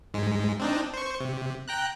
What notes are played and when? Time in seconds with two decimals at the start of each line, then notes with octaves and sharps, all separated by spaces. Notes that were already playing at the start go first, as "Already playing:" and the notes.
0.14 G#2 G#3
0.60 C4 D4 D#4
0.93 C5 C#6
1.20 C3
1.68 G5 A#5 F#6